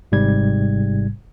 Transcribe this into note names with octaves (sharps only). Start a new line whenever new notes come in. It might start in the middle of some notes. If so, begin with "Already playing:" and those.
G#1 G#2 C3 G3 G#6